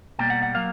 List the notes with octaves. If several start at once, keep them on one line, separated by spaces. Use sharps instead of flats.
B2 G3 A#3 G5
F#5
F#5
F#3 A#3 F5